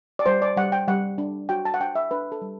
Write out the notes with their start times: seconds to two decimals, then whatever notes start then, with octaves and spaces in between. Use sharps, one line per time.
0.19 D5
0.26 G3 C5
0.42 D5
0.57 G3 F#5
0.72 G5
0.88 G3 F#5
1.18 D4
1.49 F#4 G5
1.65 A5
1.74 F#5
1.80 D4 G5
1.95 E5
2.11 D4 B4
2.32 A4
2.41 G3